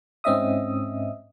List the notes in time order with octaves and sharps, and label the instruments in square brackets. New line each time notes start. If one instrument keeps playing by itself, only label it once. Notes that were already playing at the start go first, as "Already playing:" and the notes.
[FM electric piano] G#2 C4 C#4 D#5 E5 D#6